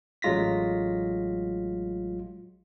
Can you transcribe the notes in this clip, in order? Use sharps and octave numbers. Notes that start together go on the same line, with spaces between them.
A1 F#3 G#3 F4 A#6 B6